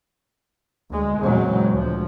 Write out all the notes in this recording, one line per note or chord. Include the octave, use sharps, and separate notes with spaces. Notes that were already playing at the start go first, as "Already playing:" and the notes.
D2 G#3
E2 A#2 C#3 F#3 G#3 C4
D2 F3